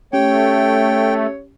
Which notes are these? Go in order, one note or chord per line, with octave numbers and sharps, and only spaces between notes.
A3 C#4 G4 C#5 G5